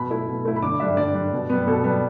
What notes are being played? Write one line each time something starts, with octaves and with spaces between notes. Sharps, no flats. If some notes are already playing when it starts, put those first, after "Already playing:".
Already playing: B2 B5
A3 E4
B2
A3 E4
B5
D3 D6
G3 D4 E5
D3 D5
G3 D4
B2
G3 B3
B2 A4
G3 B3